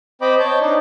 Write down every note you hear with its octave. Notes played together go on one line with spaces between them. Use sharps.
C4 C5 D#5 G5 B5 D6
C#5 A5 G6
D4 D#4